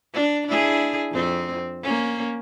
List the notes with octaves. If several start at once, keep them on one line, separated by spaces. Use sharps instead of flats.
D4
D4 E4 G#4
F2 C4
A#3 C#4